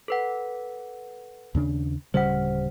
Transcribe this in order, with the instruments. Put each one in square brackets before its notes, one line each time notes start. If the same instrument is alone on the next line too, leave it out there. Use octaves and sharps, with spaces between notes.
[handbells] A4 B4 F#5
[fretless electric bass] D#2 C#3 D4
[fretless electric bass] D1 C#3 G3 [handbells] C5 F#5